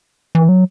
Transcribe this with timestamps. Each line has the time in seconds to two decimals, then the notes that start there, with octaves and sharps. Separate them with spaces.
0.35 E3
0.49 F#3